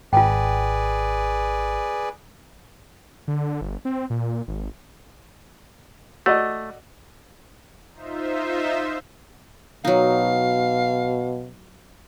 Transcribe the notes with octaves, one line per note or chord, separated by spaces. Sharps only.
G#1 F4 G#4 B4 D5 G5
D3
G1
C4
A#2
G#1
A3 F#4 D5 D#5
D#4 F4 C5 E5
B2 F#3 D#4 F5